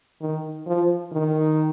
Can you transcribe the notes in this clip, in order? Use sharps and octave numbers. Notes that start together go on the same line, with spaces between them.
D#3
F3
D#3